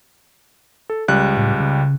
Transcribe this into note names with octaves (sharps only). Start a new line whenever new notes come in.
A4
C#2 G3 F#6
A2
C#3